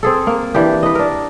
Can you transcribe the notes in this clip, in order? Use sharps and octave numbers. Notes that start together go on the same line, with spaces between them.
C4 G#4 A4
A#3
E3 D4 G4
B4 D#5
D4 A#4